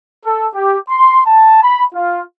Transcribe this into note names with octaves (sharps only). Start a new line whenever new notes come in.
A4
G4
C6
A5
B5
F4